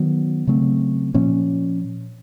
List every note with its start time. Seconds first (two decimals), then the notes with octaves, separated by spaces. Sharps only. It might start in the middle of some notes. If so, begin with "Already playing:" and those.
Already playing: D#3 F#3 B3
0.47 C#3 F#3 A3 C4
1.14 A#2 F3 A#3 C#4